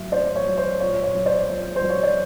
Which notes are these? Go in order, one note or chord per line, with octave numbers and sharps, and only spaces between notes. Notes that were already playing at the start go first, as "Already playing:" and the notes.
Already playing: A2 F#3 E5
A2 C5 D5
C#5
F#3
C5
A#2 C#5
C#5
F#3
C5 D5
A#2
C5
F#3
C#5
D5